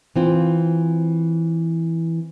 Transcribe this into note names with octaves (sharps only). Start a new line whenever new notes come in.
E3 C4 F4